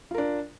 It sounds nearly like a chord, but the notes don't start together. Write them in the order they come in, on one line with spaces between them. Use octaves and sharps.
F4 A#4 D4